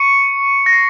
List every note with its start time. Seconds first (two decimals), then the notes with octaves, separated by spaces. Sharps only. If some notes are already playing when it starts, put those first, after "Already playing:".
Already playing: C#6 C#7
0.66 A#6
0.73 C7